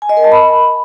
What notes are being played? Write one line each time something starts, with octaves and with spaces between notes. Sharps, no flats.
G#5
D#5
A#4
A5
B5